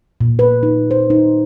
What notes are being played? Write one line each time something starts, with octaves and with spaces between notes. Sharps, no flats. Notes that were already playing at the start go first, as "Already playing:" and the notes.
A#2
B4
D#4
C5
D#4